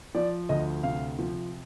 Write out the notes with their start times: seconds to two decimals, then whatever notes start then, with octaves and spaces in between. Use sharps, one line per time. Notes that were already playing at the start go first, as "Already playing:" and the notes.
0.15 F3 D5
0.49 D2 D#5
0.83 C3 F5
1.19 F3